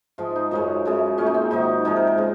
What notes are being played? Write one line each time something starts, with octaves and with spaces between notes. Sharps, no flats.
G#2 F3 G#3 F4
D#4
F#2 C#3 G#3 D#4
F#2 C#3 G#3
A#2 G#3 C#4
D#4
C4
G#2 D#3 F#3 D#4
C3 F3 G#3 D#4
A#4
A#4
C#3 G#3